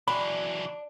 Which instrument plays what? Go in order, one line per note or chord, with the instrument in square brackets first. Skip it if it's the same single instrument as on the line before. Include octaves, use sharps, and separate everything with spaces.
[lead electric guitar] E3 F#3 [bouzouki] D4 [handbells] B5